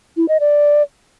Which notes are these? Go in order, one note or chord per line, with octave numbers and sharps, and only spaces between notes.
E4
D#5
D5